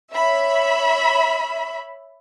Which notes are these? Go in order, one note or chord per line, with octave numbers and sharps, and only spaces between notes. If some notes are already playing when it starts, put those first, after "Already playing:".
C#5 E5 B5